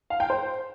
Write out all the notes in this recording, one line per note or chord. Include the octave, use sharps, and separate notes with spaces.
F5
G5
C5